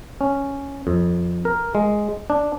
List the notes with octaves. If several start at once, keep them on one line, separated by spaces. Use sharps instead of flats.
C#4
F2
A#4
G#3
D4